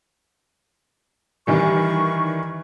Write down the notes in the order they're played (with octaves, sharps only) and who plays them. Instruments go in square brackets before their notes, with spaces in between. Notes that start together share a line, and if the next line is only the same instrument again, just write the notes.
[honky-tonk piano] D#3 E3 G3 [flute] C#6